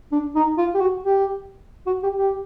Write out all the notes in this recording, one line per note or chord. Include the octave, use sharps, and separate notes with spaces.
D4
D#4
F4
G4
F#4
G4
F#4
G4
G4